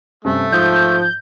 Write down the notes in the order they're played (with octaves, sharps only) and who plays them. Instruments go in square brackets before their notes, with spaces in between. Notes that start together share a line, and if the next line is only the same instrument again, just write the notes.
[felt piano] G2 C3 C#4 [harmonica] A3
[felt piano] G#2 D#6 [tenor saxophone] F3 [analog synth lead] G6